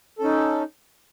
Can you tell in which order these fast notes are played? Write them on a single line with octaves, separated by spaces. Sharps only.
A4 C#4 D#4